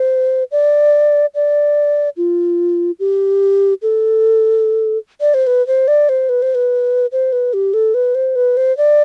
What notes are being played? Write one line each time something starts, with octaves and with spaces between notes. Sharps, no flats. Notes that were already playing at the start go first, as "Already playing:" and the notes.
Already playing: C5
D5
D5
F4
G4
A4
D5
C5
B4
C5
D5
C5
B4
C5
B4
C5
B4
G4
A4
B4
C5
B4
C5
D5